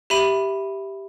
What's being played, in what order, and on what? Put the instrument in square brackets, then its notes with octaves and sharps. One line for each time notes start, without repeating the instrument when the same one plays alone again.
[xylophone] G4 E5 B5 D#7